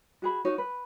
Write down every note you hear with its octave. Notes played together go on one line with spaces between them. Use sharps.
F#4 G#4 B5
D#4 F#4 C#5
B4